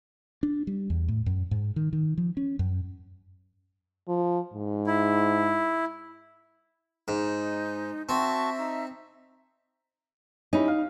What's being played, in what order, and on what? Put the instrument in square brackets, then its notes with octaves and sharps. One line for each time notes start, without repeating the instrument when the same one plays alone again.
[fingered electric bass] D4
G3
E2
A2
F#2
G#2
D#3
D#3
F3
C#4
F#2
[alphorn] F3
G#2
[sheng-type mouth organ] E4
[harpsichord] G#2 [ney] D#4
[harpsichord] C4 [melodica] F#4 A5 C#6 [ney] E5
[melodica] D#4
[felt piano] C#4 E4 G4 [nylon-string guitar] D#4
[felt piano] F5